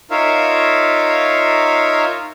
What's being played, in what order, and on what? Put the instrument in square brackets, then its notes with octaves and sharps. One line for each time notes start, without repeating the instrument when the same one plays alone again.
[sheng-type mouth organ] D#4 F4 A#4 C#5 E5 F5